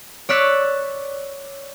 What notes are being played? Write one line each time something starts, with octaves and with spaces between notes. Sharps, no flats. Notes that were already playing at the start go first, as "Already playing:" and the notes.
C#5 D5 E6 F#6 B6